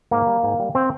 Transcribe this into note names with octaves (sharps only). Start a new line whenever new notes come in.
G#2 A#3
G3
G#2
G3
C4